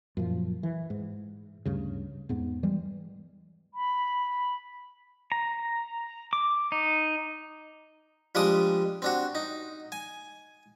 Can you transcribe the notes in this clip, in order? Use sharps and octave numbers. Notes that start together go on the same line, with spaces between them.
F#2 A#2 F3
E3
G#2
D2 G2 C#3
E2 G#2 B3
E3 G3 G#3
B5
A#5
D6
D#4
F3 G3 G#3 D4 D6 D#6
C4 D4 F#4
D#4
G#5